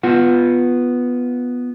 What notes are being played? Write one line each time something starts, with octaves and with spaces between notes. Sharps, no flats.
B3 F4 F#5